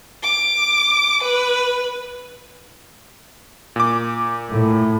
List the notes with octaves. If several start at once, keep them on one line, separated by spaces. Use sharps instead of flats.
D6
B4
A#2 D6
A2